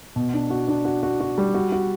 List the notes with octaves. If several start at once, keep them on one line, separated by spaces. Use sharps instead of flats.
B2
D4
F#4
D4
F#4
F#4
F#4
G3
F#4
F#4